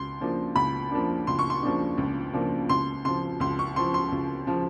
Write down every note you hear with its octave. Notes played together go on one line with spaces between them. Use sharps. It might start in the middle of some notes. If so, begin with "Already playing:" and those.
Already playing: C#2 C6
C#3 F3 A#3 D4
C#2 B5
C#3 F3 A#3 D4
C#2 C6
C#6
C6
C#3 F3 A#3 D4
C#2
C#3 F3 A#3 D4
C#2 C6
C#3 F3 C6
C#2 C6
C#6
C#3 F3 C6
C6
C#2
C#3 F3